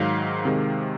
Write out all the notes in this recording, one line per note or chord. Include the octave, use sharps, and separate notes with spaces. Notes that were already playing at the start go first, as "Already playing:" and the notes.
Already playing: G#2 D#3 F#3 F5
C3 D#3 G#3